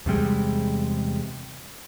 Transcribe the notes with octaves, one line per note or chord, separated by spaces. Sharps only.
E2 C3 G3 G#3